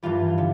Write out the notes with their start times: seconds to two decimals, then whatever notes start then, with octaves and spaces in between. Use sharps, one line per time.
0.03 G2 E3 G3 F4
0.38 D3